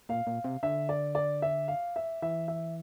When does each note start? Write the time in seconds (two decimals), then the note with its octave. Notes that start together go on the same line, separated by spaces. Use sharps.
0.09 A#2 F5
0.27 A#2
0.44 C3
0.63 D3 E5
0.89 D5
1.15 D5
1.42 E5
1.68 F5
1.96 E5
2.22 E3 E5
2.48 E5